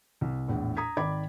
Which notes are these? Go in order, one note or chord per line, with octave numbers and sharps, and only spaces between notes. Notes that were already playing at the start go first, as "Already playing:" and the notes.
C2
A#1 E2 A2
A#5 D#6 G#6 B6
G#1 D#3 D5 B5 D6 G#6